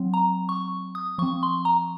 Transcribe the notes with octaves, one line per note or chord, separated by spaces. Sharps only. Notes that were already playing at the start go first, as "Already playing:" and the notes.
Already playing: F#3 C4
A#5
C#6
D#6
F3 C4 C#6
C6
A#5